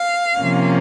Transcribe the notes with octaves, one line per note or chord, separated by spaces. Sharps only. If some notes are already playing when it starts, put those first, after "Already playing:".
Already playing: F5
C3 F3 A#3 C#4